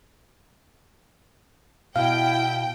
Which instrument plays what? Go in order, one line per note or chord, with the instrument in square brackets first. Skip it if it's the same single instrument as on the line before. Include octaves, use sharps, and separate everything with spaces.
[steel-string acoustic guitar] B2 [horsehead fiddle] E4 [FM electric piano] F5 [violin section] G5